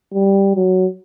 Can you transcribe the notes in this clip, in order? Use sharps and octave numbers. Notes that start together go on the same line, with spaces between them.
G3
F#3